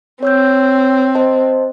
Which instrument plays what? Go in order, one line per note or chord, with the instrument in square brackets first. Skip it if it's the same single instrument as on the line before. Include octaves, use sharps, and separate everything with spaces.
[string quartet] C4 [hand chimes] C#5 E6 G6
[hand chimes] C5 D#5 A5